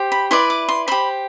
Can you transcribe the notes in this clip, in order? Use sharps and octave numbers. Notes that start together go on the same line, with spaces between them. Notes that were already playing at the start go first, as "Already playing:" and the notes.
Already playing: G4 C5
B5
E4 B4 D5 C6
D6
C6
G4 C5 B5